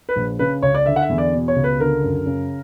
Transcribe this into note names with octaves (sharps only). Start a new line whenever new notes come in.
B4
A#1
C#3 B4
C#2 C#5
D5
D3 E5
F#5
E5
E2
D5
B2
C#5
C#2
B4
D3 A#4
F#2
C#3